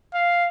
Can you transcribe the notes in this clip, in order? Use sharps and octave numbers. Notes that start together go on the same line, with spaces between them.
F5